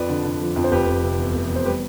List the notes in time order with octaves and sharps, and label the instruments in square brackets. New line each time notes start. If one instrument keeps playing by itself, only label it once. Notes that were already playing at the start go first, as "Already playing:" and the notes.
Already playing: [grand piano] F2 F3 B4 D5
D3
D3
F3
F2
C5
F1 G4 B4
F1
C3
E2
F1
E2
C5
G3 G4 B4